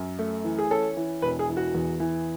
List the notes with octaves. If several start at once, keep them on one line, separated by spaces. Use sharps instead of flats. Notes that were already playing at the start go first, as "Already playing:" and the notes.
Already playing: F#2
A3
E3
G#4
C#4 A4
E3
E1 B4
G#4
E3
F#4
E2
E3